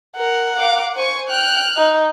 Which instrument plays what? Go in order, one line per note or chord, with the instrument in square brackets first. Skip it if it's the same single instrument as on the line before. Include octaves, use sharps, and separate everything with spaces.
[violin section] A#4 [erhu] F#5
[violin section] A#4 F5 D6
C5 G#5 C#6
[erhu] G5 [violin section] F6 F#6
[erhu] D#4